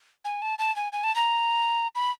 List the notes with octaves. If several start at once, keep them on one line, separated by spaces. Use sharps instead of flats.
G#5
A5
A5
G#5
G#5
A5
A#5
B5